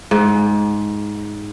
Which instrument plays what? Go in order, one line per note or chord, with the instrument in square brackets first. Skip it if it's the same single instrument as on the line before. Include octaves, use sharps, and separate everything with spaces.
[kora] G#2